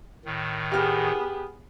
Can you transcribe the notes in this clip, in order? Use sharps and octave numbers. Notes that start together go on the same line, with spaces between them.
A2 D#3
B3 G4 G#4 F6